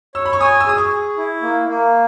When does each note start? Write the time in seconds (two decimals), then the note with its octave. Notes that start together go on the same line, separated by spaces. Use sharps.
0.15 C#5 E6
0.26 B5
0.33 C#6
0.41 G#5 D#6
0.61 E6
0.66 G#4 D#6
0.78 C#6
0.92 G#4
1.17 E4
1.42 A#3
1.68 A#3